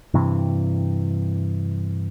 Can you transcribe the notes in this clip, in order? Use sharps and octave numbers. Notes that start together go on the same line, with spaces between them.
G2 C3 E3